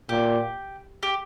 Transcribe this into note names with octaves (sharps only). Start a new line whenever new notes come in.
A#2 G4
G4